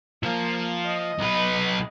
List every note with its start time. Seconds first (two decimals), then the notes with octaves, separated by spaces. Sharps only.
0.23 F3 A#3
0.86 D#5
1.19 B1 B4